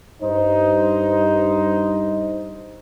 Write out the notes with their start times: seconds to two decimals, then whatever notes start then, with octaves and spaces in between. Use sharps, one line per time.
0.22 G2 D#4 C5